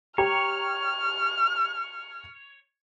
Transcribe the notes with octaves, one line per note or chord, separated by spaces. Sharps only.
G4 C#5 A#5 F6